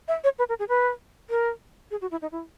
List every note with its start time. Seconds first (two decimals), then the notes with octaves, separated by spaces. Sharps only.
0.08 E5
0.24 C#5
0.39 B4
0.49 A#4
0.59 G#4
0.69 B4
1.30 A#4
1.91 G#4
2.01 F#4
2.11 E4
2.22 D#4
2.32 E4